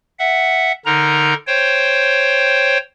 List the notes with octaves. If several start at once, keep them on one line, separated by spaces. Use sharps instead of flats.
E5 F#5
D3 D#4 A#4 A#5
C5 C#5 G5